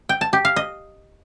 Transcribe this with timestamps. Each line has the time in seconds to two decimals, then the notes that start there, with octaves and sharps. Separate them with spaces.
0.09 G5
0.21 A5
0.33 G4
0.45 F5
0.56 D#5